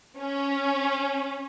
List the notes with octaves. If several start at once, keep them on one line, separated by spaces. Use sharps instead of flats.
C#4